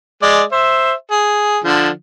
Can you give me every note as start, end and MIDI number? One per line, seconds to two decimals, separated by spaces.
0.23 0.42 56
0.23 0.42 74
0.52 0.93 72
0.52 0.93 76
1.11 1.59 68
1.64 1.89 50
1.64 1.89 53